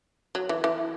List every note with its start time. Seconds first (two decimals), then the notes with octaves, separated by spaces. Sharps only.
0.35 F#3
0.49 E3
0.64 E3